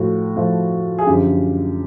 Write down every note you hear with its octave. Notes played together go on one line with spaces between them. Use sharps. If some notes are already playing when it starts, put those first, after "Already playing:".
Already playing: A2 F3 A3 F#4
A2 F3 A3
G#4
F#2 D3 F3 G4